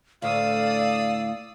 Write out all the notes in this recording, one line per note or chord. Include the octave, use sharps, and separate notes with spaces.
D2 A2 D5 F5 D#6 E6